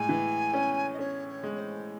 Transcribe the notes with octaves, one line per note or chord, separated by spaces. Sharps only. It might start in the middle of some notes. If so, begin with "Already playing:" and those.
Already playing: A2 G#3 G#5
E3
C#4
D#5
C#4 C#5
C#5
G#3
C#5
C5